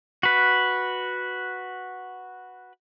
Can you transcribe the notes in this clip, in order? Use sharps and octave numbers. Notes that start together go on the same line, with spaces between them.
F#4 B4